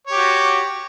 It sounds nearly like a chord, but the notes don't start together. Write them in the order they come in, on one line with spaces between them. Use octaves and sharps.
C#5 G4 F#4